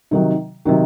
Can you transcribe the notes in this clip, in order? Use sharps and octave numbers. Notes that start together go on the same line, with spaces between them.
C3 D#3 F#3
C3 D#3 F#3